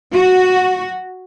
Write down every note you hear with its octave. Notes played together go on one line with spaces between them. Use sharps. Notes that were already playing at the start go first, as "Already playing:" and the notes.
F#4